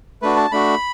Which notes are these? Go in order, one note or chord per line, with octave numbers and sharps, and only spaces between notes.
A3 D4 F#4 B4
A5
A3 D4 F#4 B5